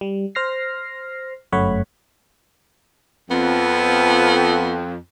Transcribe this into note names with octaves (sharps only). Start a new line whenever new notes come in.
G3
C5 F6 A#6 C7
G1 F#2 A3 C#5 F#5 B5
F2 B3